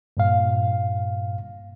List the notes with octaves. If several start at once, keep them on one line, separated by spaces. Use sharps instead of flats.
G2 A#2 F5